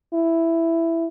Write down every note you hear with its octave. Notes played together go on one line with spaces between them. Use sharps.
E4